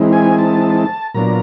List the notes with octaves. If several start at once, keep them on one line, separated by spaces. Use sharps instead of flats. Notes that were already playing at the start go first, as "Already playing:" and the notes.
Already playing: E3 G#3 C4 D#4
G#5
A5
A#2 F#3 B3 D4 F4 A#5